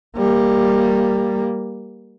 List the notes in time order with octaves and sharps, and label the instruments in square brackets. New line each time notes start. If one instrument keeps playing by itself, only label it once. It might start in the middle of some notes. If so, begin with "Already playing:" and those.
[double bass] G3 A#3